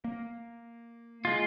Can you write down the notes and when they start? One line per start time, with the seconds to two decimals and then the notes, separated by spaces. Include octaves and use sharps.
0.04 A#3
1.25 G#3 F4